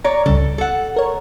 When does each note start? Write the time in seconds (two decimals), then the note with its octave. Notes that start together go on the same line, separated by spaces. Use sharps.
0.04 C#5 D5 A#5
0.26 C#2 G2 C#3 A4
0.58 A4 F#5
0.96 A#4 C#5